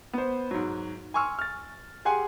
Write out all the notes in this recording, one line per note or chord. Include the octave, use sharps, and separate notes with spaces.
B3 C5
G#2 F#3
G#5 C6 C#6 E6 F6
F6 A6
G4 G#4 F#5 G#5 C6